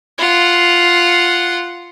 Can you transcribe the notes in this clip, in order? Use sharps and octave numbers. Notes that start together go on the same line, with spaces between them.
F4 F#5